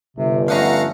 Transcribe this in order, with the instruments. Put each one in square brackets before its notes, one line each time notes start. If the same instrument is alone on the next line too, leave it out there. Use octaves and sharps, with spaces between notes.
[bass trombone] G1 [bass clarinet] C3
[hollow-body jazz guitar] F3 C#4 [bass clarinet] A3 [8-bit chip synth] F5 F#5 A#5